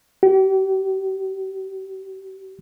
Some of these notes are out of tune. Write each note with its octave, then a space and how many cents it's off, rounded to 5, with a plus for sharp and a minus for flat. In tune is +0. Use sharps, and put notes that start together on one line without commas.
G4 -40